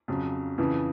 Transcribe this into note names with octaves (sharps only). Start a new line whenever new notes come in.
F2 C#3 F#3
F2 C#3 E3